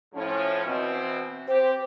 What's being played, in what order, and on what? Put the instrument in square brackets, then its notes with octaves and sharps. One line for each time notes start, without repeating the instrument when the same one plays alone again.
[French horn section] A2 F3 C#4
B2 E3 C4
[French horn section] C4 G4 [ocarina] C5